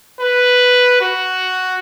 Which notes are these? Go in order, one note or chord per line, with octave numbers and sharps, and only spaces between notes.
B4
F#4